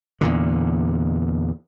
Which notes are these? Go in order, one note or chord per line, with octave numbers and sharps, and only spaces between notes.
E2 A#2 D3